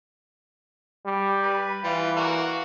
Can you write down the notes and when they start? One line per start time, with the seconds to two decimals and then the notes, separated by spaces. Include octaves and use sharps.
1.06 G3
1.43 B4
1.84 E3 G3 F4
2.17 A#3 F#4 C#6